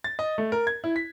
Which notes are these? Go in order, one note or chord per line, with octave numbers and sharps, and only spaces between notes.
A6
D#5
A3
A#4
G#6
E4
B6